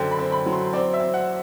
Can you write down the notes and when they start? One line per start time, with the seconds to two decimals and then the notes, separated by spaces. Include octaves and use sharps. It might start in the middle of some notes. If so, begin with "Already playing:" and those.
Already playing: F#2 D3 F#3 C4 G5
0.11 B5
0.19 C4
0.32 B5
0.46 F#3
0.53 C6
0.73 C4 D5
0.94 E5
1.00 C4
1.14 F#5